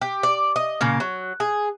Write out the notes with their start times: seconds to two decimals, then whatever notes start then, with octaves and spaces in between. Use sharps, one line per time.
0.01 G4
0.23 D5
0.56 D#5
0.81 A#2 C#3 A#3
1.00 F#3
1.40 G#4